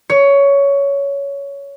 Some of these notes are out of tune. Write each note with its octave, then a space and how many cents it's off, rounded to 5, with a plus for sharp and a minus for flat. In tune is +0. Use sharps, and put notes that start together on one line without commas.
C#5 +15